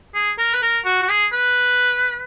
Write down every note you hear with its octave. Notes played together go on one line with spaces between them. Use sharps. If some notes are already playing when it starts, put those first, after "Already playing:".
G#4
A#4
B4
A#4
F#4
F#4
G#4
B4